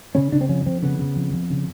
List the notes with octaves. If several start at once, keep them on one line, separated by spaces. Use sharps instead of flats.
C#3 C#4
C#3 D4
C4
F2 C#4
F2 C4
C#3 B3
C#3
F2
F2
C#3